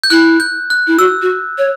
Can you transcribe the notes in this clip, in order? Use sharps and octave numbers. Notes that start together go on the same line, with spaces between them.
G6
E4 F#6
G6
F#6
E4
F#4 E6
F#4
C#5